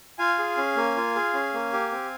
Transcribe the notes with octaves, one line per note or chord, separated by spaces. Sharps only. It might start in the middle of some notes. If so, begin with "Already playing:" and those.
F4 F5 G#5
G#4
C#4
A#3
F4
G#4
C#4
A#3
G4
C4